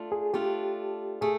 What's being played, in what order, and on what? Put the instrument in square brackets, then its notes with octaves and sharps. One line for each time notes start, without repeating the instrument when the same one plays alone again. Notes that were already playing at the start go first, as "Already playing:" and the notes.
Already playing: [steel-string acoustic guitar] A3 D4 F4
[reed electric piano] G#4
[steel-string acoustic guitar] A3 D4 F4 [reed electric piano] G4
[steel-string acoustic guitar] A3 [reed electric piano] G#4